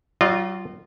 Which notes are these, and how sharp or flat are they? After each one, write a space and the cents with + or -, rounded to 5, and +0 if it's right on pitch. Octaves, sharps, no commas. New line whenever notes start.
F#3 +40 F4 +0 D#5 -35